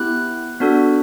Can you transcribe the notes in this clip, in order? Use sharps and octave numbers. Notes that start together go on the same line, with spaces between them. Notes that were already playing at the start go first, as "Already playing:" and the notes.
Already playing: B3 E4 G4 F#6
B3 D4 F#4 A4